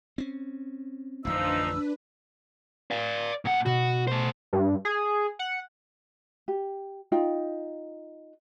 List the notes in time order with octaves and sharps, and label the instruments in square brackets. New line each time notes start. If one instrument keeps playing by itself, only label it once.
[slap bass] C4 C#4
[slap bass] A1 F2 D3 [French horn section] F3 D#4 [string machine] D4 B4 [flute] E6
[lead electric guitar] D5 F5
A#2 F#5
[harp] B2 [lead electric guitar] F#4
[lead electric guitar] A3 C5
[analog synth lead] G2
G#4
F#5
[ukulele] G4
D#4 F4 G5